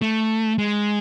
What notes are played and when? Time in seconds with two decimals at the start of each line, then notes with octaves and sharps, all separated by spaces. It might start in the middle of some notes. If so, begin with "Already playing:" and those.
0.02 A3
0.58 G#3